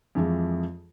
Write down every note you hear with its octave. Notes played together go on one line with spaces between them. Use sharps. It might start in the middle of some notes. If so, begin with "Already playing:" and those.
F2 E3 F3 G#3